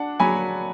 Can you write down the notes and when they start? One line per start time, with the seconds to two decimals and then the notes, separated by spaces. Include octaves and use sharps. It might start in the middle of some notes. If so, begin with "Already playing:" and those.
Already playing: D4 F#5 A5
0.20 F#3 G#5 B5